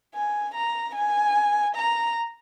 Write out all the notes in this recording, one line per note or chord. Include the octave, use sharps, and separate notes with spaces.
G#5
A#5
G#5
A#5